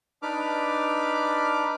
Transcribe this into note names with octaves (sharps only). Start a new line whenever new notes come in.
D4 D#4 B4 D6 F6